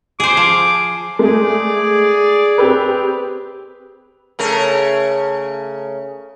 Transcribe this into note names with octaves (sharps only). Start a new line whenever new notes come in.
G#4 C5 D6
F3
G#3 A3 G#4 D5
C4 G4 B4
C#3 A3 A#4